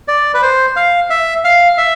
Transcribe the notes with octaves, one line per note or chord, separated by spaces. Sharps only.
D5
B4
C5
F5
E5
F5
E5